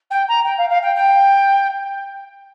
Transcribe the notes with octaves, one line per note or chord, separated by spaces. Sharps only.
G5
A#5
G5
F5
F5
G5
G5